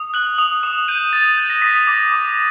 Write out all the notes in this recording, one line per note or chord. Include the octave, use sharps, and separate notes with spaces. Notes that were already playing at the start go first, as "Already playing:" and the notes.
Already playing: D#6
F#6 F#7
D#6 F7
D#6 E7
G6 D#7
D#6 A6
G6
A#6
D#6 B6
D6
D6